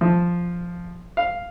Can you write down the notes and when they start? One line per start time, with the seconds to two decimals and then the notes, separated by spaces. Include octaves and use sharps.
0.01 F3
1.17 F5